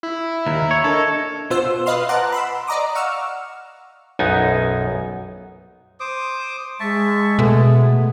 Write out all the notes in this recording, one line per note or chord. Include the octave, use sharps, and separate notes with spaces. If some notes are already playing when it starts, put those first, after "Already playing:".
E4
D#2 E5 A#5
C#5
D4 A4 A#4 D#5
B2 B3 F4 C5 E6
B4 D#5 F5 C6 F6
F#5 A5 A#5 D6 F#6
B5 C6 E6
D5 D#5 A#5 D6 D#6
F5 F#5 C#6 E6 F6
B1 F#2 B3 D#4 G#5
C5 D6 D#6
G#3 E5 A5 C#6
B2 A3 B3